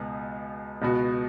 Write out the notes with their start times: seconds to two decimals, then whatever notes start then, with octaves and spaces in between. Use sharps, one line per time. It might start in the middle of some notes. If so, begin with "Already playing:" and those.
Already playing: C#2 B2 B3 G#4
0.82 C#2 B2 B3 F#4